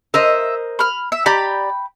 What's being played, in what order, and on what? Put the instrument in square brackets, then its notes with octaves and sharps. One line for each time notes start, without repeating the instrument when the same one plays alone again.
[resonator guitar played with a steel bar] A#4 C5 D#5 [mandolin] E5
[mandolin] B5 F6
E5
[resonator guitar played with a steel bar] G4 D5 A#5 [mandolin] G5 B5